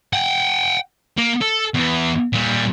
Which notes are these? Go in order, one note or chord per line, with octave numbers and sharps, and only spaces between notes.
F#5 G5
A#3
A4
E2 E3
A#2 G3